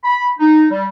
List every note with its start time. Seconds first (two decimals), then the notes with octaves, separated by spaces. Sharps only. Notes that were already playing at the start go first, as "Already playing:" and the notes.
0.04 B5
0.39 D#4
0.71 G3